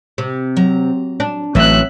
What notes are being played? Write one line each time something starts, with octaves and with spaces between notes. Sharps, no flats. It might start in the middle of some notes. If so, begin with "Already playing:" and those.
C3
F#3 A#5
D4
A1 F#3 C4 C#4 B4 E5 F#6